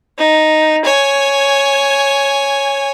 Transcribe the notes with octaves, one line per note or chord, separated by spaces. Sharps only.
D#4
C#5 G#5